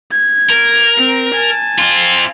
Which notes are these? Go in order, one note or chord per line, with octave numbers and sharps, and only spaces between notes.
G#6
A#4
C4
G#5 A5
C4 F4